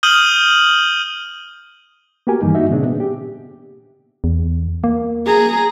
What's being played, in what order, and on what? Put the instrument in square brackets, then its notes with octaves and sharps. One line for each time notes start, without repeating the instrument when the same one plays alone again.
[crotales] D#6 F6 G6 D#7 F#7 G7
[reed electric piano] A#3 B3 F#4 G4 A#4 G#5
G2 D#3 E3 G3 A#3 D#4
D#4 F#4 E5
A#2 C#3 A#3 C4 D4 G#4
B3
G4
[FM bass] E2
A#3
[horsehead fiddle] G#4 A#5